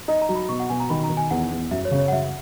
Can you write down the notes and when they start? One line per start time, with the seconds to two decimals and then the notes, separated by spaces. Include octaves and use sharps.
0.08 D#4 D#5
0.22 A#5
0.29 F#3
0.35 B5
0.49 B2 C#6
0.60 F#5
0.70 B2 G#5
0.80 A#5
0.90 D#3 B5
1.04 A#5
1.10 D#3
1.17 G#5
1.31 E2 F#5
1.51 E2
1.71 F#2 E5
1.85 C#5
1.91 C#3
1.98 C#5
2.08 F#5
2.12 F#2 E5